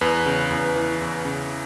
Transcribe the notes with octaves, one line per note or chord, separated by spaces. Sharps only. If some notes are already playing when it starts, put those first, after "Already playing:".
E2 B4
C#3
E2
E3
E2
C#3